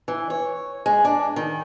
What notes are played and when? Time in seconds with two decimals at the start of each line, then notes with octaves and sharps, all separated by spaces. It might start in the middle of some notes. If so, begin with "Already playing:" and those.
0.08 E3
0.30 C#5
0.86 G#3
1.05 D4
1.36 D#3